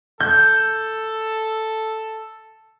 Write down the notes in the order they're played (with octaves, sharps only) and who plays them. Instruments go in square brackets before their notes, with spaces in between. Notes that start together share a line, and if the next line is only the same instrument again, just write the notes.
[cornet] A4 [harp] G6